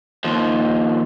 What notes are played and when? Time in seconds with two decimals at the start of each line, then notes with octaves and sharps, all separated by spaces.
0.24 D#2 F3